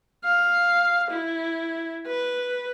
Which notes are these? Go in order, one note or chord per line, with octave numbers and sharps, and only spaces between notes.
F5
E4
B4